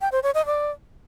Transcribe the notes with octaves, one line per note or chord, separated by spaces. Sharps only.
G5
C5
C#5
D#5
D5